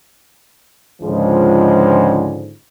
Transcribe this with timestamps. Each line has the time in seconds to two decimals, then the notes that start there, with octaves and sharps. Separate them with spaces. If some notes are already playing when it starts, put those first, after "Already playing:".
1.01 C#2 G#2 D3 F3 G#3